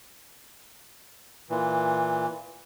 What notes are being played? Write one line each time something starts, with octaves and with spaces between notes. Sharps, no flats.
A#2 E3